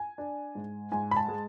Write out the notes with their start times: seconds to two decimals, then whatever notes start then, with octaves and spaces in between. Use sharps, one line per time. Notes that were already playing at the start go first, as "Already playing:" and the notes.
Already playing: G#5
0.18 D4
0.55 G#2
0.92 G#2 G#5
1.11 B5
1.16 A5
1.28 G#3